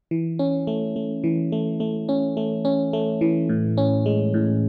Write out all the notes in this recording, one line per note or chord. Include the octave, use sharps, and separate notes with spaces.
E3
C#4
A3
A3
E3
A3
A3
C#4
A3
C#4
A3
E3
A2
C#4
G#3
A2